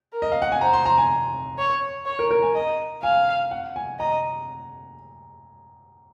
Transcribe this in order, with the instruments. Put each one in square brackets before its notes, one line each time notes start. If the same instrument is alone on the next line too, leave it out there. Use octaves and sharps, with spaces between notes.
[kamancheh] A#4
[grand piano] D#5
F5
F#5
G#5
[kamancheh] C5 [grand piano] A#5
[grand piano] C6
A#5
G#5
[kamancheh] C#5
C#5
[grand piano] A#4
A#4
G#5
[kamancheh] D#5 [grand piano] A#5
[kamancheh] F5 [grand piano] G#5
[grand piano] F#5
G#5
[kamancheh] D#5 [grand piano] A#5